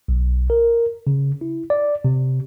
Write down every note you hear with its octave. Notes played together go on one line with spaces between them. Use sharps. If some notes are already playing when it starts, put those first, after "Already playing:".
B1
A#4
C#3
E4
D5
C3